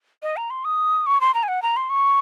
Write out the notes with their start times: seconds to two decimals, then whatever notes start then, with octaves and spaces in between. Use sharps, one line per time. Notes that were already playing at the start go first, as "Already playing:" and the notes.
0.23 D#5
0.37 A#5
0.50 C6
0.65 D#6
1.06 C#6
1.21 C6
1.34 A#5
1.43 G#5
1.48 F#5
1.62 A#5
1.76 C6
1.90 C#6